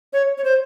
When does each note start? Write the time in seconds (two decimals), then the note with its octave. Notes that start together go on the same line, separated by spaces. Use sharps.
0.13 C#5
0.38 C#5
0.44 C5